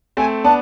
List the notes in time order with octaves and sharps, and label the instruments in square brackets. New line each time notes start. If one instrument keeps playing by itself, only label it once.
[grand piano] A3 C4 [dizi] G#5
[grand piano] B3 D4 [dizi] A5